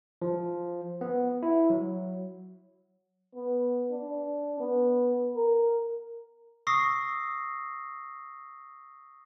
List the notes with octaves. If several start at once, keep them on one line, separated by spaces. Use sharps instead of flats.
F3
B3
E4
F#3
B3
D4
B3
A#4
C#6 D#6 E6 A#6 C7